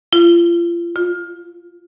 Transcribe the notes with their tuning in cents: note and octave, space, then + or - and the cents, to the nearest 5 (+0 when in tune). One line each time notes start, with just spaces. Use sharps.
F4 -35
F4 +20